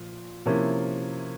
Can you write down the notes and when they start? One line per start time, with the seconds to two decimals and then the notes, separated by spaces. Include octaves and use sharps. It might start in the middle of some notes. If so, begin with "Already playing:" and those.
Already playing: A#2 F3
0.46 C3 F3 A#3 C#4 E4